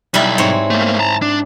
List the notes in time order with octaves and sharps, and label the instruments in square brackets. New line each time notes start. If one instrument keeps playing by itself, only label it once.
[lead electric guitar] B1 [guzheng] G3 E4
[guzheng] G#2 C4 C#5
[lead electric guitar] A3 A#3
A5 A#5
D4